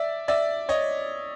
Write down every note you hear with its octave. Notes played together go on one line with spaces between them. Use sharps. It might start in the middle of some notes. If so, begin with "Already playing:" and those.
Already playing: D5 E5
D5 E5
C#5 D#5